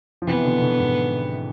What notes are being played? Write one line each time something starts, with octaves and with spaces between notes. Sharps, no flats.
F3
C3 E3 B3
B2 D3
B2 D3
G#2 B2